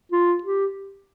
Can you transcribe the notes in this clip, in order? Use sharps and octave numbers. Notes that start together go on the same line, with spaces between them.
F4
G4